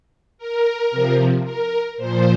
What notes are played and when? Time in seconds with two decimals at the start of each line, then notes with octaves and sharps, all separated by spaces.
0.38 A#4
0.91 C3 F3
1.44 A#4
1.97 A#2 F3 C5